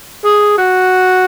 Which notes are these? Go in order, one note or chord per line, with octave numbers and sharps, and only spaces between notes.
G#4
F#4